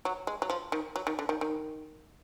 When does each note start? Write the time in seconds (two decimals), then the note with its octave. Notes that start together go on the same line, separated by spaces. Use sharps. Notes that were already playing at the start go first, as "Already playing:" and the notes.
0.05 F#3
0.27 G#3
0.42 F#3
0.50 F3
0.72 D#3
0.96 F#3
1.07 D#3
1.19 D3
1.29 D#3
1.41 D#3